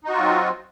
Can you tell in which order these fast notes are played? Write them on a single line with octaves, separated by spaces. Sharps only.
D#4 F#4 F4 F#3 C4